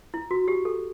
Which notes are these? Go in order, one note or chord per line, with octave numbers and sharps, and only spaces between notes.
E4
F#4
G4
A4